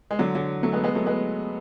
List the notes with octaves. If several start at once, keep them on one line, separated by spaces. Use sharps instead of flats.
G#3
D3 F#3
D3 F#3
F#3 A3
G#3 B3
G#3 B3
F#3 A3
G#3 B3